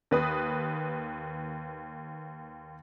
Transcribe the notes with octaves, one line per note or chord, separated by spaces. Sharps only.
D#2 B4 D#6